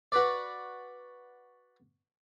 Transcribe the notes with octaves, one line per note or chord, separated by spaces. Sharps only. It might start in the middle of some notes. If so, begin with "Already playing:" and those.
F#4 B4 D5